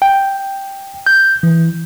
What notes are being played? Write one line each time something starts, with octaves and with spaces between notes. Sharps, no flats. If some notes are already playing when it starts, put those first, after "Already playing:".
G5
G6
E3